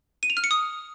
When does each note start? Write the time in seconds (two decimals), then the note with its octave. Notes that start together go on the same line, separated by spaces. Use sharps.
0.23 D#7
0.30 F7
0.37 F6
0.44 C#7
0.51 D#6